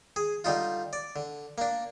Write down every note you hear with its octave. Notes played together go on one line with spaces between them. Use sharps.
G#4
D3 G3 D#4 F4
D5
D3
A#3 D4